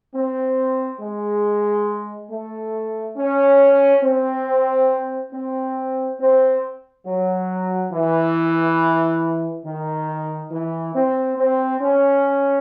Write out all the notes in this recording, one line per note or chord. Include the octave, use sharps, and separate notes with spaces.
C4
G#3
A3
C#4
C4
C4
C4
F#3
E3
D#3
E3
C4
C4
C#4